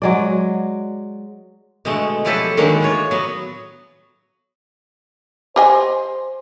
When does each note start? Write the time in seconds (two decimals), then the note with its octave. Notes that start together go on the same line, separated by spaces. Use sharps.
0.02 F#3 G#3 D5
1.85 B2 D3 G#3 A3
2.25 F3 F#3 E4 G4 A4 B4
2.57 D3 D#3 F#3 G#3 A#3 D4
2.81 A2 F4 C#5
3.11 F#3 B3
5.56 G4 C5 D#5 G#5